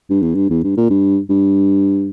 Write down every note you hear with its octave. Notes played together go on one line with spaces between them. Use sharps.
G2
E2
G2
E2
G2
A#2
G2
G2